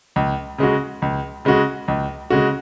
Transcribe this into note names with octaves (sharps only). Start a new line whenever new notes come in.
C#2
C#3 G#3 F#4
C#2
C#3 G#3 F#4
C#2
C#3 G#3 F#4